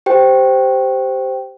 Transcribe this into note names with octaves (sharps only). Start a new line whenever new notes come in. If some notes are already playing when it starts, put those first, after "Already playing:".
G4 C5 G5